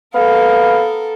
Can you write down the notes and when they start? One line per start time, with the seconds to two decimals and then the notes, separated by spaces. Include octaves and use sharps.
0.15 B3 A4 A#4 F5